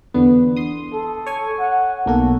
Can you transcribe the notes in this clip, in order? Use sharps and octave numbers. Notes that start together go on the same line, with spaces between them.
E2 D3 B3
C6 D#6
A4
C#5 G#5
F#5
B1 A#3 F#4 A4